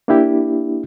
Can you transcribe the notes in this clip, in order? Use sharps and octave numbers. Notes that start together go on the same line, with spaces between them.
A#3 D4 E4 G4